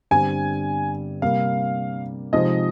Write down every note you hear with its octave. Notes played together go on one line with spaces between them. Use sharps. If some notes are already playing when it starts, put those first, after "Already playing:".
G1 G2 G3 C4 G#5
C3 G3 A#3 F5
C3 F3 G#3 D#4 G#4 D#5